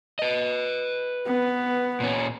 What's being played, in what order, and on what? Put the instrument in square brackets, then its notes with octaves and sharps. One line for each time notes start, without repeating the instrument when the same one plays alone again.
[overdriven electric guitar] B4 D#5
[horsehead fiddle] B3
[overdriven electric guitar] A#2 C#4